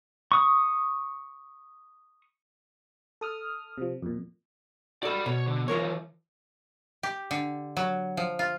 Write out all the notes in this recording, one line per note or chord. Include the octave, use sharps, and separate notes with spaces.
C#6 D#6
A4 D#6 F6
C3 F3
F2 A#2
F#4 A4 D5 B5
B2 B3 C#5
D3
E3 F3 F4 A#4 C#5
G4
D3
F#3
F3
F4